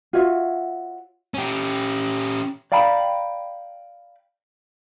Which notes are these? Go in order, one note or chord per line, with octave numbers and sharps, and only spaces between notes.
F4 F#4 C#5 E5
C#4 G4
D5 F5 G5 A#5 B5